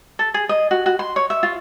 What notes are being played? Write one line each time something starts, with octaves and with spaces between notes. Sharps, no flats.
A4
G#4
D#5
F#4
F#4
C6
C#5
E5
F4